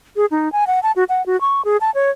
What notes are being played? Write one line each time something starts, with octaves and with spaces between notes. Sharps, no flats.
G#4
D#4
G#5
F#5
A5
F#4
F#5
F#4
C#6
G#4
A5
C#5